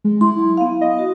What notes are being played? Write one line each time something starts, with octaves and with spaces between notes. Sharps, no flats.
G#3
E4 C6
F#3
B3 F5
D#5
F#4